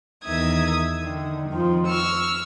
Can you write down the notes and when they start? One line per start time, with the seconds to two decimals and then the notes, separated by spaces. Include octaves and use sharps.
0.23 E2 D#3 E5 D#6 G#6
1.02 D3 D#3
1.49 F2 D#3 F3
1.86 C#6 E6 F6